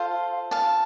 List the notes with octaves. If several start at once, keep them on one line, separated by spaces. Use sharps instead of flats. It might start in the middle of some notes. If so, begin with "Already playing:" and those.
Already playing: F4 A4 C5 F5
F5 A5